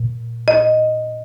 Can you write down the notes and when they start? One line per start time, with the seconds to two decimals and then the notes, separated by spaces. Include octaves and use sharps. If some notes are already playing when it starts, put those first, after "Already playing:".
Already playing: A#2
0.48 D#5